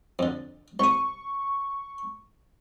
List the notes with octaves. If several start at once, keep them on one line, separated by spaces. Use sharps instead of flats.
F2 D3
C2 C#6 D#6